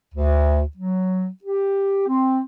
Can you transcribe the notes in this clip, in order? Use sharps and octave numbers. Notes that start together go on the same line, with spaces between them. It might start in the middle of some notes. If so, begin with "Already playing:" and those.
D2
F#3
G4
C4